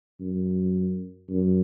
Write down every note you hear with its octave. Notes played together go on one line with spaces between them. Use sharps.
F#2
F#2